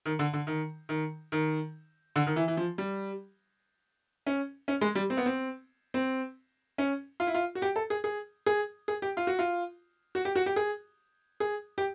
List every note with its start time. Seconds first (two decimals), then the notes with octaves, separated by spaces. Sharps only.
0.06 D#3
0.19 D3
0.33 D3
0.47 D#3
0.89 D#3
1.32 D#3
2.16 D3
2.27 D#3
2.36 E3
2.48 E3
2.57 F3
2.78 G3
4.27 C#4
4.68 C#4
4.81 G#3
4.95 G3
5.10 C4
5.17 B3
5.26 C4
5.94 C4
6.78 C#4
7.20 F4
7.27 E4
7.34 F4
7.55 F#4
7.62 G4
7.76 A4
7.90 G#4
8.04 G#4
8.46 G#4
8.88 G#4
9.02 G4
9.17 F4
9.27 F#4
9.39 F4
10.15 F#4
10.25 G4
10.36 F#4
10.46 G4
10.56 G#4
11.40 G#4
11.78 G4